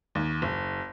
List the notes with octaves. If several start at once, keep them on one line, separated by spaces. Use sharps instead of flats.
D#2
F#1